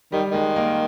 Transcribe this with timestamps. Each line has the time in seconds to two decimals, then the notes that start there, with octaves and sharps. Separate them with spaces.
0.12 D#3 G3
0.31 D#3 G#3
0.56 A#3